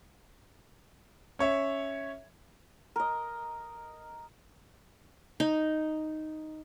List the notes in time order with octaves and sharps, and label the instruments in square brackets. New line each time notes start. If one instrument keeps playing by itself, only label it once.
[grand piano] C#4 C#5 E5
[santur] A#4 D#5
[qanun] D#4